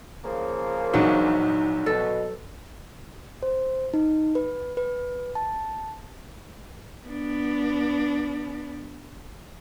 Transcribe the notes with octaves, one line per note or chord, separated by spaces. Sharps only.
C#3 F3 A#3
A#1 E2 F#3 D#4
B2 A4
C5
D#4
B4
B4
A5
B3 D4